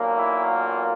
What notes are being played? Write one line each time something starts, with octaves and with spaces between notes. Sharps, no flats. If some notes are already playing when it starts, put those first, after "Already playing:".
Already playing: B1 A#2 F#3 A#3
E4
F4